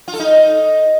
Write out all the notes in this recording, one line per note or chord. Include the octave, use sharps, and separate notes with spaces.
F4
A4
D#4